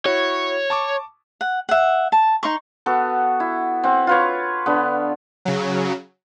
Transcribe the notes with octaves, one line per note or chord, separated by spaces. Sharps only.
E4 F#4 C#5
A5 C#6 D6
F#5
E5 F#5
A5
D#4 C6 C#6
B3 F#4 A4
E4
C4 F#5
F4 B4 C#5
D3 B3
C#3 F#3